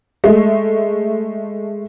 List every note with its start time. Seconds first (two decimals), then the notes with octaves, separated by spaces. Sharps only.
0.24 G#3 A3